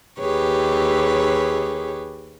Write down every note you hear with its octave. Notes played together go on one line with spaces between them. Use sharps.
D#2 G4 G#4 B4 C#5